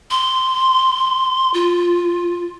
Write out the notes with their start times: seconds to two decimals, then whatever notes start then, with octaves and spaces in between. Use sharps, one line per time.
0.11 C6
1.54 F4